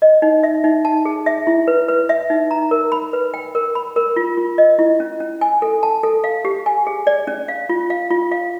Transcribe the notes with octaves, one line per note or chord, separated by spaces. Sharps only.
D#5
D#4
E5
D#4
A5
G#4
E5
E4
B4
B4
E5
D#4
A#5
A#4
B5
B4
G5
A#4
B5
A#4
F4
F4
D#5
E4
C#4
C#4
G#5
A4
A5
A4
F5
G4
G#5
G#4
D5
C#4
F5
F4
F5
F4
F5